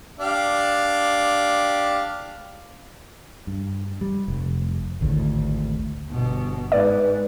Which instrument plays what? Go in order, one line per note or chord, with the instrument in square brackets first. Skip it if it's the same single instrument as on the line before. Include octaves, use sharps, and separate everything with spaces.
[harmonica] D4 G4 F5
[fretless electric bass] G2
G3
F1
G#1 D2 A2
[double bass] G1 B2
[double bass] G#2 [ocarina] B4 [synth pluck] D5